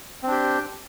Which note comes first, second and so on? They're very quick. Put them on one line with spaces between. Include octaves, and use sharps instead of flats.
C4 D4 G4